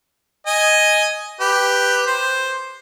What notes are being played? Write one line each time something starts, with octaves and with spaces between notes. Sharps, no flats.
D#5 G#5
G4 B4
C5